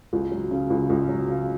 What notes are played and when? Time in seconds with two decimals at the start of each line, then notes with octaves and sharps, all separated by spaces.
0.13 C#2
0.31 F#3
0.51 C#3
0.70 C#2
0.90 C#2
1.09 F#3
1.29 C#3